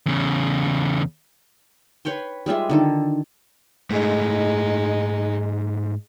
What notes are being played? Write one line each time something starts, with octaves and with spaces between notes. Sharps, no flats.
E2 C#3
B4 C#5 G5 C6
G3 G#3 F4 E5
D3 D#3 A4
G#2 G#3 A3 D#4